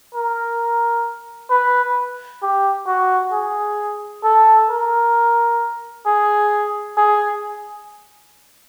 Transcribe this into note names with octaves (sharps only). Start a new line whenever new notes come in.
A#4
B4
G4
F#4
G#4
A4
A#4
G#4
G#4